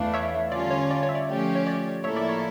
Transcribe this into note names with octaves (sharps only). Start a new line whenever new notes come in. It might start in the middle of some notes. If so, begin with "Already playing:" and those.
Already playing: E2 E3 A3 D4 D5 F5
C#5 E5
D3 G3 C#4 F4 D5
C#5
D5
C#5
E5
D5
F3 A3 C#4 G4
C#5
D5
A2 F3 A#3 E4 A4 C#5 E5
D5
C#5